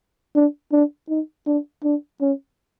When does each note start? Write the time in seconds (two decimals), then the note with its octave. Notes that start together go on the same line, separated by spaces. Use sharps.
0.35 D4
0.72 D4
1.09 D#4
1.46 D4
1.84 D4
2.21 C#4